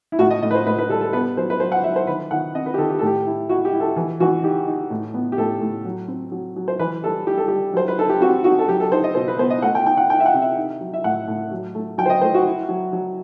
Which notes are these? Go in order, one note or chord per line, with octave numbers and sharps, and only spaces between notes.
E4
A2 F#4
D#5
A2 D#5
B4
C5
A2 B4
B4
G3 A4
A4
B3 B4
F#3 C5
B4
F#3 C5
F#5
F#3 E5
C5
D#3 B4
D#3 F#5
C4 D#5
B4
G4
D#3 A4
G4
A2 A4
G4
E4
E4 F#4
G4
E4
A4
E3
E3 F#4
D#4 G4
D#4
A2
B3
G4
A2 A4
A2
F#3
C4
F#3
F#3
C5
E3 B4
G3 A4
G3 G4
A4
G3 G4
F#3 C5
B4
D#4 A4
G4
C4 F#4
D#4 F#4
A4
F#3 G4
A4
D#4 C5
D#5
B2 C5
B4
B3 C5
D#5
A3 F#5
G5
D#4 G5
F#5
D#4 G5
E5
F#5
C3
E5
D#4
F#3
E5
A2 F#5
A2
F#3
A3
F#3 G5
C5
D#5
A3 C5
F#4
E4
F#3
F#3